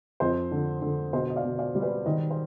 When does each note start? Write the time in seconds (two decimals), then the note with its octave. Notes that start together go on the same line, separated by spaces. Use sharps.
0.20 F2 C5 D#5
0.51 D3
0.82 D3
1.13 B2 C5 D#5
1.30 D#5
1.36 D5 F5
1.44 B2
1.59 D5 F5
1.75 G3
1.82 B4 D5
2.06 D#3 C5 D#5
2.31 C5